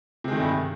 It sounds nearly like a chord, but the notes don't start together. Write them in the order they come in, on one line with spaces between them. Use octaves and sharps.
C3 G#3 D#3 A3 G2